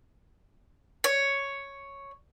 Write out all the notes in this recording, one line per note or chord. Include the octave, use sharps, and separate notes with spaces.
C#5